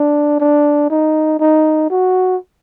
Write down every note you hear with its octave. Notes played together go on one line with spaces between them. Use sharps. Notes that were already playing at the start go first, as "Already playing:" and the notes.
Already playing: D4
D4
D#4
D#4
F#4